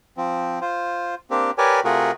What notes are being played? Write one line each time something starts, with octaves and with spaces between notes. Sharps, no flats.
F3 C4
F4 C5
A#3 C4 D4 G4
G4 A#4 B4 C#5 D5 G#5
C3 A3 F4 F#4 G#4 A#4